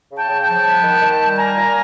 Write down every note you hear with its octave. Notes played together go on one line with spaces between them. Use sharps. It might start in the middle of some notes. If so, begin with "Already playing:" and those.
C#3
G5 A5
C#3
G5 A5
F3
B3
D#3
D#3
G3
A#3 G#5 A#5
A#2